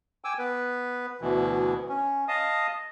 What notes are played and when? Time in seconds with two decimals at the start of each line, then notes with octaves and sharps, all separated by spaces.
0.24 G5 G#5 D6 E6
0.39 B3 B4
1.21 D2 B2 E3
1.89 C#4
2.28 D#5 F5 A5 D#6